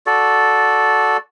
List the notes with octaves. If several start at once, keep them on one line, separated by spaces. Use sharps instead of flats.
F#4 A4 D5